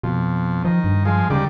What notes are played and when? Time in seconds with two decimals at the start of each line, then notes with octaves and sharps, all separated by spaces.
0.04 F2 B2
0.65 D#3 F3
0.84 G2
1.05 F3 G#3
1.30 D#2 C#3 G3 D5